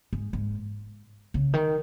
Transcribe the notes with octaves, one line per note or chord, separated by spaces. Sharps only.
G#2
G#2
C#3
D#3